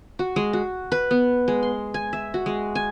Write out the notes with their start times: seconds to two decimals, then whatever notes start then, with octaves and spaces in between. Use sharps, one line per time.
0.19 F#4
0.36 G#3
0.53 F#4
0.92 B4
1.11 B3
1.48 G#3
1.63 C6
1.94 G#5
2.13 E5
2.34 F#4
2.46 G#3
2.75 G#5